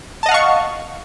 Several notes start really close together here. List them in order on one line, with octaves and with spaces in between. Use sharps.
A5 D#5 F#5 F5 C#6